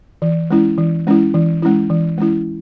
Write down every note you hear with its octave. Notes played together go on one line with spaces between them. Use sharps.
E3
G#3 C#4 E4
E3
G#3 C#4 E4
E3
G#3 C#4 E4
E3
G#3 C#4 E4